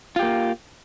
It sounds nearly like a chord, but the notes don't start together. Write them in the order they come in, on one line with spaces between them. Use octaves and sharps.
F4 G4 A#3